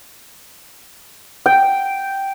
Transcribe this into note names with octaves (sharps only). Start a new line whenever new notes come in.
G5